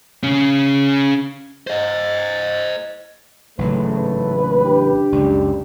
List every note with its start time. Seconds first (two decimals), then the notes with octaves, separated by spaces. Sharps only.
0.23 C#3 C#4
1.67 C5 D#5
3.58 A1 G#2 C#3 F#3 A3 B4
3.96 B4
4.34 A#1 D#2
4.64 D4 G4
5.12 C#2 F#2 G3